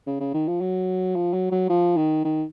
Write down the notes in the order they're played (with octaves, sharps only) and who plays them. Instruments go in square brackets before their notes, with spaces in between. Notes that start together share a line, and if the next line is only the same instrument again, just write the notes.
[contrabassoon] C#3
C#3
D#3
F3
F#3
F3
F#3
F#3
F3
D#3
D#3